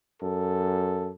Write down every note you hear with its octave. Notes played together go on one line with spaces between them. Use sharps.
F#2 A4